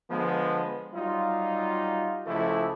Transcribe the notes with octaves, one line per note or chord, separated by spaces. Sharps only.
D3 F3 G#3 B3
F#3 G3 D#4 F4
C#2 F3 G#3 A3 E4 A4